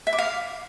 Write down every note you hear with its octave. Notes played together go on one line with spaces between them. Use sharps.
E5
D6
F5